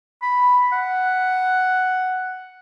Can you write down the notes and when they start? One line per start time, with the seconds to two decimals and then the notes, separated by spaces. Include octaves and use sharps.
0.22 B5
0.72 F#5